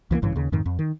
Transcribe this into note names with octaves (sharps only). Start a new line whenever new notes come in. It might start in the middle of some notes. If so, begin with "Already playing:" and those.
C#2 E3 F3 A#3
A1 G2 C#3 E3
D#2 C#3
F2 G#2 D#3
F2
D#3